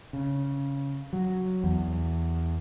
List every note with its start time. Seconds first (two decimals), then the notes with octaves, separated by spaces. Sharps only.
0.13 C#3
1.13 F#3
1.64 E2